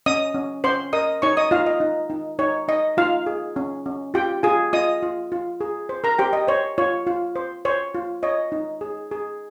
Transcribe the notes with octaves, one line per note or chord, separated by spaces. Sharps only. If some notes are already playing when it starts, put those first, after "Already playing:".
C#4 D#5 D#6
C#4
C#4 C5 C6
A#4 D#5 D#6
D#4 C#5 C#6
D#5 D#6
D#4 F4 F5
D#5
D#4
D#4
D#4 C#5
D#4 D#5
D#4 F4 F5
G#4
C#4
C#4
F4 G4 G5
F4 G#4 G#5
F4 D#5 D#6
F4
F4
G#4
C5
A#4 A#5
G4 C5 G5
D#5
C5 C#5
F4 C#5
F4
C5
C5 C#5
F4
C#5 D#5
D#4
G#4
G#4